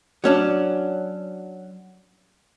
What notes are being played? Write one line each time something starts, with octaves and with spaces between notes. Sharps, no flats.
F#3 C#4 D4